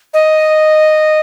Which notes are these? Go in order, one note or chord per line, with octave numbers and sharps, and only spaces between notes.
D#5